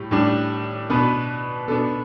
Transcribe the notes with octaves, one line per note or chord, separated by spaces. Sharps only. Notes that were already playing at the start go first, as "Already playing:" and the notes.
Already playing: A2 G3
A2 G3 D4
B2 B3 D4 B4
B2 B3 D4 A4